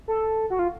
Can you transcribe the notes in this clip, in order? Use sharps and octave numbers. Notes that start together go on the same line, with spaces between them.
A4
F#4
F4